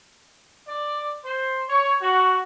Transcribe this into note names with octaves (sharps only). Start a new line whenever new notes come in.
D5
C5
C#5
F#4